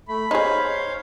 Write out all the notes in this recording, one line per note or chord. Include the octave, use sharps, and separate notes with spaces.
A3 B5
D#4 G#4 C5 C#5 F5